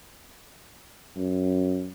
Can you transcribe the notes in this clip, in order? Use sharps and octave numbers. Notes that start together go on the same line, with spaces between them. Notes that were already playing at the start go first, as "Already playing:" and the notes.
F#2